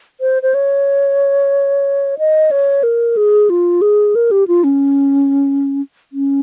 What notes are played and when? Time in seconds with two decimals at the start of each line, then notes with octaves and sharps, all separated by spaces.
0.21 C5
0.43 C5
0.54 C#5
2.19 D#5
2.51 C#5
2.83 A#4
3.17 G#4
3.50 F4
3.81 G#4
4.15 A#4
4.31 G4
4.48 F4
4.64 C#4
6.12 C#4